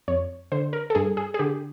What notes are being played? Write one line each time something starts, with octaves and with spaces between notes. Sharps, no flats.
F2 C#5
D3 C5
A#4
A4
G2 G#4
G#4
G#4
D3 G4